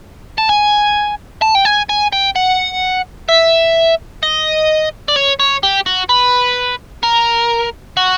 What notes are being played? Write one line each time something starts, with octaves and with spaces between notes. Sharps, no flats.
A5
G#5
A5
G5
G#5
G#5
G5
F#5
E5
D#5
D5
C#5
C#5
G4
F#4
B4
A#4
F#4